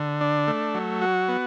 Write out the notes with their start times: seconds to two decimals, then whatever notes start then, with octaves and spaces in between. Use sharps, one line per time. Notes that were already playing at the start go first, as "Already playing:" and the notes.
Already playing: D3
0.21 D4
0.47 A3
0.75 F#3
1.02 F#4
1.28 B3